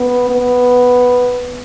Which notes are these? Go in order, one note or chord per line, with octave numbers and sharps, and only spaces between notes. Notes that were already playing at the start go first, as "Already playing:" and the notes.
Already playing: B3
B3